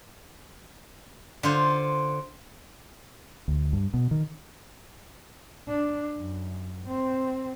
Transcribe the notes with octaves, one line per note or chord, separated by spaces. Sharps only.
D3 F4 C5
D2
G2
B2
D#3
D4
F#2
C4